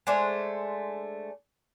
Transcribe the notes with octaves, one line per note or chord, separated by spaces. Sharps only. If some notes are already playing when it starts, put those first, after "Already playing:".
G#3 A3 D4 C5